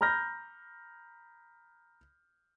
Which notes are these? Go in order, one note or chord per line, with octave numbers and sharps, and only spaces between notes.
A#5 B5 F6 G6 A#6